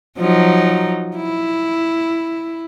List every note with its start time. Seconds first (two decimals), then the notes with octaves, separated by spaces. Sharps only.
0.18 F3 F#3 D#4
1.16 E4